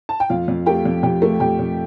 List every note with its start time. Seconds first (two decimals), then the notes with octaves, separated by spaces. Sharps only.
0.09 A5
0.20 G5
0.29 F2 F4 F5
0.48 F2
0.66 A3 G4 G5
0.85 F2
1.03 F2 G4 G5
1.22 A3
1.40 F2 G4 G5
1.59 F2